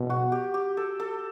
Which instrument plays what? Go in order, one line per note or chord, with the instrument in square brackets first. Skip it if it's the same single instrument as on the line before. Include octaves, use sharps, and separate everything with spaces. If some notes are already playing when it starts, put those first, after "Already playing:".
Already playing: [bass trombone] B2
[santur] F#4
G4
G4
A4
A4